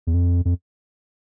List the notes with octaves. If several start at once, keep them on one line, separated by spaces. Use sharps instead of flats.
E2
F2
F2